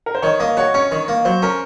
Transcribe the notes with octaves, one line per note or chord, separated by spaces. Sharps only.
A#4
C5
D#3 C#5
A#3 D#5
F#4 C#5
C#4 C#5
D#3
A#3
F#3 C5
C#4 A#4